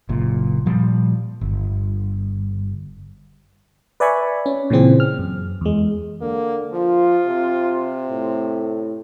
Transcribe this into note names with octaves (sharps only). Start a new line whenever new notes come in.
F#1 A#2
A#2 F3 G3
G1
B4 D5 E5 G#5 B5 C#6
C#4
A#2 C#3 E3 C4 G#4
F6
F#2
E2 G#3
D3 A#3
F3 F4
C3
A2